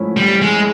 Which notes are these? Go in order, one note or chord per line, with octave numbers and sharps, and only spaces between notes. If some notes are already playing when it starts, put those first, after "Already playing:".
Already playing: G#2 F3 A3 C#4 E4
G3
G#3